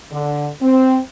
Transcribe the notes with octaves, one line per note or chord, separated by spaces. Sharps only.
D3
C4